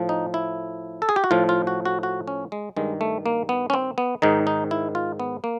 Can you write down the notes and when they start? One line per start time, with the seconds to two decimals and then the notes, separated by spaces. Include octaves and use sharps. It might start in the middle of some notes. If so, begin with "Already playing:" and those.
Already playing: A2 F3
0.09 D#4
0.34 E4
1.02 A4
1.09 G#4
1.16 G4
1.24 F#4
1.31 A2 F3 F4
1.49 F4
1.67 F#4
1.85 F#4
2.03 F#4
2.28 C#4
2.52 G#3
2.77 G2 D#3 G#3
3.01 A3
3.26 A#3
3.49 B3
3.70 C#4
3.74 C4
3.98 B3
4.22 G#2 D#3 D#4
4.47 D#4
4.71 E4
4.95 F4
5.20 B3
5.44 A#3